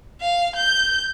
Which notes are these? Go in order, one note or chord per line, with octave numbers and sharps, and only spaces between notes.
F5
G6